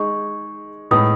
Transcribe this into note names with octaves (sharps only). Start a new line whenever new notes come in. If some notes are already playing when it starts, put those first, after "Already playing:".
Already playing: G#3 D#4 G#4 C#6
A2 G#3 B3 D#4 D#6